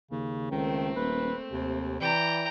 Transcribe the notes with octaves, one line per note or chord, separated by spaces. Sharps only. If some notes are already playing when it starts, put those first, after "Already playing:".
D#2 C#3
C#2 D#3 A3 A#3 C4
D#1 B4
D#2 C3
E3 E4 D5 G5 A#5